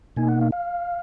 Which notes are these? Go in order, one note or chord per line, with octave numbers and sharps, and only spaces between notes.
B2 A#3 D#4 G#5
F#5
F5
F5